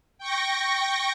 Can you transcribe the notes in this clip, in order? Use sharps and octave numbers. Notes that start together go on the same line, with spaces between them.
G5 C#6 A#6